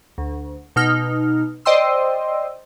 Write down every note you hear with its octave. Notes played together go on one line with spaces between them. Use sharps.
D2
B2 D#4 F6
C5 D5 D#5 G5 C6 E6